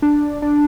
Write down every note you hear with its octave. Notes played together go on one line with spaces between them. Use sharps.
D4
D4